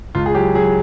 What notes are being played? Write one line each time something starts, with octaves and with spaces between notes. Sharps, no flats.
C#2 F4
G#4
F#3 G4
F#3 G#4